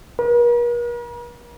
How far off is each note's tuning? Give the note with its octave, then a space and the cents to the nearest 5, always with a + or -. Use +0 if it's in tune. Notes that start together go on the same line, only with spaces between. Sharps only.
A#4 +45